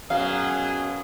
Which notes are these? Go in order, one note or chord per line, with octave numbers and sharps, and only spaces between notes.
F#2 B2 F#3 G#4 F5